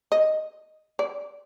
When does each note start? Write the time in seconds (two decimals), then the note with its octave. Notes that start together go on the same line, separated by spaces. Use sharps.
0.12 D#5
0.99 D5